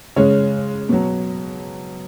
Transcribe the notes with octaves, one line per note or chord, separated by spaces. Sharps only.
C#3 G#3 C#5
B2 F#3